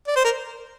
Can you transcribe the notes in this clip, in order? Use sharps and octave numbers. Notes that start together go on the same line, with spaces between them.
D5
C5
A#4